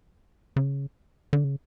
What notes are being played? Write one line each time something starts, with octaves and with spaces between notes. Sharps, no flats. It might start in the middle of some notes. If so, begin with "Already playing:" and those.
C#3
D3
C#3